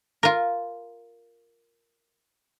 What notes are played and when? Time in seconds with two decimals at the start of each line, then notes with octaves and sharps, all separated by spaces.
0.23 F4 A#4